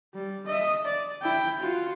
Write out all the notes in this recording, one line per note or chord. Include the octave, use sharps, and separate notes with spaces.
G3
D#5 E5
D5
E4 G5
F4 F#4